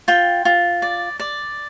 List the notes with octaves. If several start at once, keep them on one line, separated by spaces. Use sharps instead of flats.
F4 G5
F4
D5
D5